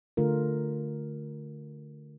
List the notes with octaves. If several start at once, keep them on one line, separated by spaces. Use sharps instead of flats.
D3 A3 F4 A#4